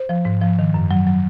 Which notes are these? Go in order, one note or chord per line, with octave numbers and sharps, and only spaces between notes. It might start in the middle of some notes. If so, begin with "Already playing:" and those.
Already playing: C5
F3
G#2
F3
D#3
F#2
F#3
F#3